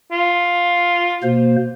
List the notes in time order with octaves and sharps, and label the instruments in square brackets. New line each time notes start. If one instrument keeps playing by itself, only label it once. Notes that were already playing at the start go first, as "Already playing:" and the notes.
[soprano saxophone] F4
[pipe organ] B2 A#3 C5